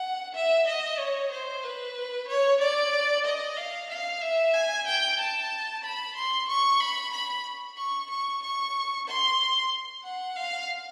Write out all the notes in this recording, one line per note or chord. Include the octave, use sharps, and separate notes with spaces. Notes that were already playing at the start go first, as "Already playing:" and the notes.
Already playing: F#5
E5
D#5
C#5
C5
B4
C#5
D5
D#5
F5
F5
E5
G#5
G5
A5
B5
C6
C#6
B5
B5
C#6
C#6
C#6
C6
F#5
F5